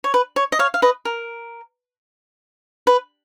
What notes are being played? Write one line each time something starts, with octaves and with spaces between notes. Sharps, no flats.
C#5
B4
C#5
D#5
C#5 F5
F5
B4 D#5
A#4
B4